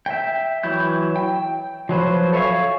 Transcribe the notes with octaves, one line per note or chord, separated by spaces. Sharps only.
E5 G5
E3 F#3 E4 G6
G5
F3 F#3 B4 C5
A4 C#5 E5 F5 G#5